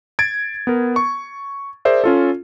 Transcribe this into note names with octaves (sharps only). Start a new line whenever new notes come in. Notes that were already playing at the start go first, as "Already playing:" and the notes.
G#6 A6 D7
B3 A#4
C#6
G#4 A#4 C5 D5 E5
C#4 F4 A4